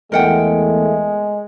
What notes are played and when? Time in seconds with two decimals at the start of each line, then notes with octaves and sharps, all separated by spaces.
0.12 E2 G#3 A3 A#4 F#5 G5